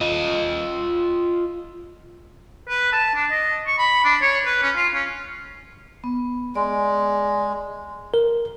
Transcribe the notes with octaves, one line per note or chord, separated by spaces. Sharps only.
F4 D#5
B4
A5
D4
D#5
C#6
B5
D4
C#5
B4
C#4
F4
C#4
B3
G#3 D5
A#4